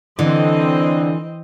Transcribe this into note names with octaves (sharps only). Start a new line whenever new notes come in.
D3 E3 C4 D#5